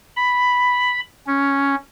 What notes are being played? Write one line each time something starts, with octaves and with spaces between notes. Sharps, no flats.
B5
C#4